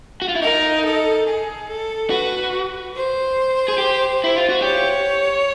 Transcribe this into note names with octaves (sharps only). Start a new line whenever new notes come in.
F#4
F4
E4
D#4 A#4
A4
G#4
A4
F#4 B4
C5
G#4
G4
E4
F4
F#4
G4 C#5